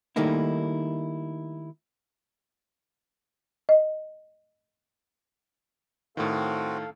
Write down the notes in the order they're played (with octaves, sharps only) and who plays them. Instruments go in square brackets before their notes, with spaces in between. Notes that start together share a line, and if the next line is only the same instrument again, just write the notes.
[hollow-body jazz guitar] D#3 G3 A3 A#3 D#4 E4
[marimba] D#5
[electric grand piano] A2 D#3 [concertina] C4 F#4 [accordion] A4 F5